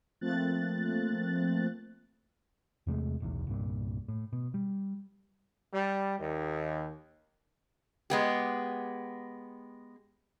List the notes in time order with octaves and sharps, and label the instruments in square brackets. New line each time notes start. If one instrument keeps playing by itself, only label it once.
[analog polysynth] F3 A3 A#3 C4 F#6 A6
[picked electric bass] E2 C3 G#3 A3
D1 B1 E2
C2 G2 A#2
A2
B2
G3
[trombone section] G3
D#2
[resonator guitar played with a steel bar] G#3 B3 G4